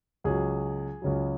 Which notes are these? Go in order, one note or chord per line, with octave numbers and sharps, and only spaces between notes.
C#2 C#3 F#3 G#4
C#2 C#3 F#3